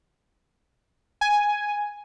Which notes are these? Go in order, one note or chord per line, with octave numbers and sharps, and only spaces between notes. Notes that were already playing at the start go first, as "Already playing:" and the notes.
G#5